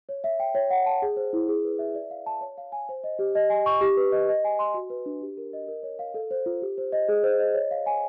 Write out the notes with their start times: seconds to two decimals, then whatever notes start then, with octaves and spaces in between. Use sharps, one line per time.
0.09 C#5
0.24 E5
0.40 G5
0.55 C#5
0.70 F#5
0.86 A5
1.02 G#4
1.17 C5
1.33 E4
1.49 G#4
1.64 B4
1.79 E5
1.95 D5
2.11 F5
2.26 A5
2.41 C#5
2.58 F5
2.72 G#5
2.89 C5
3.04 D#5
3.19 G4
3.35 D#5
3.50 G#5
3.66 C#6
3.81 G4
3.97 B4
4.12 D#5
4.29 D#5
4.44 G#5
4.59 C6
4.74 F#4
4.90 B4
5.06 D4
5.21 G4
5.37 A#4
5.53 D#5
5.68 A#4
5.83 C#5
5.99 F5
6.14 A4
6.31 C5
6.46 F4
6.62 G4
6.78 C5
6.92 D#5
7.09 G#4
7.24 C5
7.39 D#5
7.54 C#5
7.71 F5
7.86 G#5